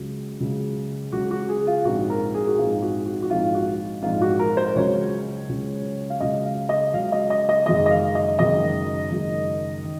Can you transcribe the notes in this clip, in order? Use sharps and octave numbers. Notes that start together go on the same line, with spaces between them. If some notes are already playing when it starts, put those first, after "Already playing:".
Already playing: C#2 C#3 F#3
C#2 C#3 F#3
C#2 C#3 F#3 F#4
F#4
G#4
F4
A#1 G#2 F3 C4 D#4 F#4
A#4
G#4
F#4
A#1 G#2 F3 C4 D#4 F4
F#4
F#4
F#4
A#1 G#2 F3 C4 D#4 F4
F#4
A#1 G#2 F3 C4 D#4 F4
F#4
A#4
C5
C#2 C#3 F#3 C#4 C#5
C#2 C#3 F#3 C#4
F5
C#2 C#3 F#3 C#4 D#5
F5
D#5
C#2 C#3 F#3 C#4 F5
D#5
D#5
D#5
F#1 F#2 D#3 G#3 D#5
D#5
F5
D#5
F#1 F#2 D#3 G#3 D#5
F#1 F#2 D#3 G#3
D#3